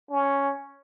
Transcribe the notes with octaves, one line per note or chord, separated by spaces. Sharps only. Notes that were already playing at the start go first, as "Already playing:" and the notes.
C#4